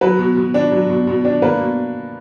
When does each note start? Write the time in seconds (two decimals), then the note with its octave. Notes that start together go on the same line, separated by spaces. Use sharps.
0.01 F#3 B4
0.19 B2
0.37 B2
0.54 D4
0.72 F#3
0.89 B2
1.07 B2
1.25 D4
1.42 A#3 B4
1.60 B2